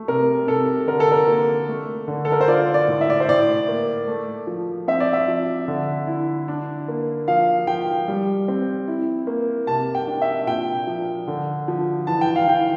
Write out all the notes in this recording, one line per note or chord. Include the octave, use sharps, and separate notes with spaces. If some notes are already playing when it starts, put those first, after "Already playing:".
Already playing: A3
C3 A#4
C3 A4
D3 A#4
A4
A#4
A#3
A3
D3
A4
A#4
C5
F4 D5
D5
A2
E5
D5
C5
A2 D5
A#3
A3
F3
C4 E5
D5
E5
F3
D3
E4
D4
A#3
F3 F5
F3 G5
G3
C4
E4
A#3
C3 A5
G5
D4
E5
A#2 G5
F3
D3
F3
E3 A5
G5
F5
E3 G5